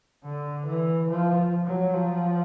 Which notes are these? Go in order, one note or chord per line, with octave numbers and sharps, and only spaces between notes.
D3
E3
F3
F#3
F3